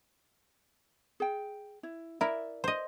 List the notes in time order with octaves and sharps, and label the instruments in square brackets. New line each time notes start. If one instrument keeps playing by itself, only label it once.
[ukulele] G#4 G5
E4
[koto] E4 A#4 [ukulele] D5 E5
[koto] C5 D#5